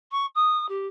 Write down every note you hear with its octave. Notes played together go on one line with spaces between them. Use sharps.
C#6
D#6
G4